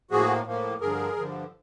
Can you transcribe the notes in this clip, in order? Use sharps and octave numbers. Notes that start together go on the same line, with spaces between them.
A2 F3 A#3 F#4 G#4
A2 F3 A#3
G2 D3 F3 G#4 A#4
G2 D3 F3